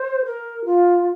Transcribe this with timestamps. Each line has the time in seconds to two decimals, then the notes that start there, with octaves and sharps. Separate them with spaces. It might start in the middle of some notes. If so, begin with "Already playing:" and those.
Already playing: C5
0.25 A#4
0.65 F4